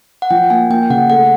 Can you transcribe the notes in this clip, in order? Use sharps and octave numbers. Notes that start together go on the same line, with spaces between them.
F#5
F3 G5
A#3 G#5
A#3 G5
C#3 F#5
A3 F#5